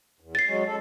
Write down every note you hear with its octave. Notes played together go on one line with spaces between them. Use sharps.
E2
A6 C7
F#3 G#3 C#4
A4